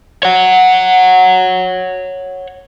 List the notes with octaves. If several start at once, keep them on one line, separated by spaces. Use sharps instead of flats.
C#5 F#5